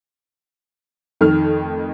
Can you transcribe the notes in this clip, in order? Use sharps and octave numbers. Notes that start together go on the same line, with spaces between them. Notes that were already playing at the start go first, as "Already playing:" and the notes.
F2 D#3 A3 D#4 F6